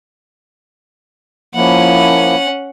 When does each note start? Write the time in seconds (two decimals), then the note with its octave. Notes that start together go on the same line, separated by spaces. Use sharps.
1.55 F3 A#3 C#4 E4 F#5